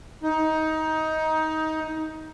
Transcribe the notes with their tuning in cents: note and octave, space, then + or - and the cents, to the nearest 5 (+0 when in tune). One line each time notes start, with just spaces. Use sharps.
D#4 +15